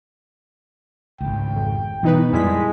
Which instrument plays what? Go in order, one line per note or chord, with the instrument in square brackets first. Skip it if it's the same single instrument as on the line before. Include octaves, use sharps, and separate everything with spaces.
[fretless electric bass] G#1 C#2 [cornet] G5
[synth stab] F2
[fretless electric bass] B2 [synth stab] E3 D#4 B4
[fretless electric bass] F2 A#2 F3 [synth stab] G3 E4 B6 [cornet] G#3